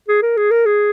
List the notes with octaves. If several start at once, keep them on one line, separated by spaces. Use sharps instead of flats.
G#4
A#4
G#4
A#4
G#4